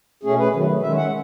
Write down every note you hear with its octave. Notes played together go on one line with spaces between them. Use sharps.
B2 A3 C#4 G#4
B4
D#3 F#3 A3
D#3 G#3 C#4 E5
F#5